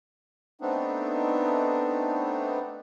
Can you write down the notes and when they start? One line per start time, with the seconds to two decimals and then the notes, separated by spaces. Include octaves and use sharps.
0.61 A3 B3 C4 D4 D#4